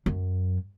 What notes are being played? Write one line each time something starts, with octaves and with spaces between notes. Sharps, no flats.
F#2